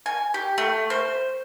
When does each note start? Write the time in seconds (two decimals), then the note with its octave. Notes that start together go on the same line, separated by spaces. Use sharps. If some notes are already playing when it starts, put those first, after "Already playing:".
0.06 G#5
0.34 G4
0.58 A3
0.90 C5